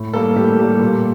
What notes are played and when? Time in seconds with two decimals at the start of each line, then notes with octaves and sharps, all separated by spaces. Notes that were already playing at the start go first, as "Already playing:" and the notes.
Already playing: A2
0.13 G3 A#3 A4
0.36 A2 G4
0.59 G3 A#3
0.81 A#2